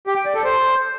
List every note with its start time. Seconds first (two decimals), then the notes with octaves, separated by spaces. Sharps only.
0.07 G4
0.16 G5
0.26 D5
0.35 A4
0.44 C5